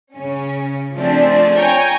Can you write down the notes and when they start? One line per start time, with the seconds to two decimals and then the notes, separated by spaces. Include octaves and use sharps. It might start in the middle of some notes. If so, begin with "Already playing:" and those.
0.13 C#3 C#4
0.96 F3 A3 C4 D4 G#4 D5
1.58 C#5 G5 G#5 A#5 C#6